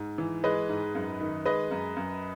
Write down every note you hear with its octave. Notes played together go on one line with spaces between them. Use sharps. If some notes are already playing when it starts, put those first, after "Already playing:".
Already playing: G#2
E3
G#3 B4 D#5
G#2
F#2
D#3
G#3 B4 D#5
F#2
F#2